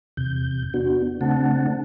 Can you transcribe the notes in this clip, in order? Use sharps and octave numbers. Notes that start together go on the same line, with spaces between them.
E2 C3 G6
B3 D4 F#4
C#3 A3 C4 D4 F#5 A5